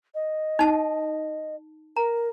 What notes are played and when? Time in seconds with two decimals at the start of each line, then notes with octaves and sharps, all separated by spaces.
0.15 D#5
0.59 D#4 A5
1.97 A#4 A#5